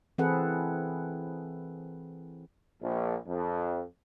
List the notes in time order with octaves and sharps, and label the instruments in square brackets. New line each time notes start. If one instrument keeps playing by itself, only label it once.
[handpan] E3 C4 G#4 A4 B4 F#5
[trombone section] A#1
F2